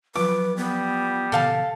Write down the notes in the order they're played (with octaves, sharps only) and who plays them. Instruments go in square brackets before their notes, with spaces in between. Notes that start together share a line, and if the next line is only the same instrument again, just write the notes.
[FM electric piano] F3 F#3 F4 [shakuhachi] B4 [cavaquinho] D6
[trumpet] G3 [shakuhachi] B3
[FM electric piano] A#2 C#3 E3 [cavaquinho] A4 F5 A5